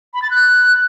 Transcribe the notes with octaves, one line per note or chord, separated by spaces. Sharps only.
B5
A6
F#6